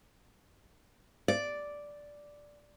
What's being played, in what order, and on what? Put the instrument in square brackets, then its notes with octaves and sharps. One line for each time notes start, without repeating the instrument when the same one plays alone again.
[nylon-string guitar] D5